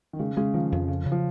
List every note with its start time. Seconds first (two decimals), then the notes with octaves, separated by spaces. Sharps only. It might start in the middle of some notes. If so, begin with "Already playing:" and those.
0.13 D#3
0.20 C#3 G#3
0.37 C#3 G#3
0.54 D#3 F3
0.72 F2
0.88 C#3
1.05 C#3
1.12 F3